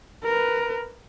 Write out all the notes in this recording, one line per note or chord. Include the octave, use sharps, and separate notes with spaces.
A#4 B4